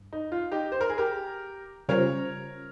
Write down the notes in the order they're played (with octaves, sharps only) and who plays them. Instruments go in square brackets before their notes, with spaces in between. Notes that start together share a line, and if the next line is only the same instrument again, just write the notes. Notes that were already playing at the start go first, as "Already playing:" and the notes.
Already playing: [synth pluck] G2
[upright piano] D#4
F4
D#4 G4
C5
A#4
G#4
G4 A#4
[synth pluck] C#3 G3 C#4 F4 C5 [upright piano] A#4 C#5